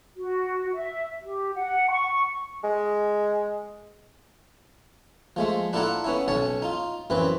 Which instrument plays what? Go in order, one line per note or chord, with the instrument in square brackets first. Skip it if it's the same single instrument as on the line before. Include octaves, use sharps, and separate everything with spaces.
[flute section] F#4
E5
G4
F#5
C#6
[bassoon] G#3
[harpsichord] F3 G#3 A3
D4 E4 F4 A4 F#5 A#5
B3 C#4 E4
B1 C#4 C#5 A5
D#4 F4
F#2 E3 C4 B4